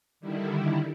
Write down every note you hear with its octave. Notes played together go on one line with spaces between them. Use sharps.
D3 D#3 G3 E4